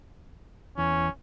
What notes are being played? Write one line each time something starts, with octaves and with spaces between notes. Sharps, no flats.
E2 C#4